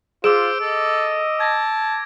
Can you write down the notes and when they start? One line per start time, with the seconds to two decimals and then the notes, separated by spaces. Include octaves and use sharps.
0.24 F4 G#4 C5 D6 E6 D7
0.60 A4 D#5
1.40 A5 G#6 A#6